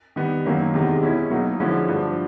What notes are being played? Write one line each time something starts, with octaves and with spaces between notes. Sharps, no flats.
D#3 G3 B3
F#2 D#3 F#3 A#3 C#4
E2 C3 D#3 G#3
B2 G#3 C#4 E4
B2 F#3 A#3 D#4
D3 F3 G#3 C#4 E4
G2 D3 F3 A3